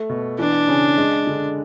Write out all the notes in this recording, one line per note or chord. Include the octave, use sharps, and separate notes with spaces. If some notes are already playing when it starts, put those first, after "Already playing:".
Already playing: A3
B2
E3 D4
C#3
G#3
D3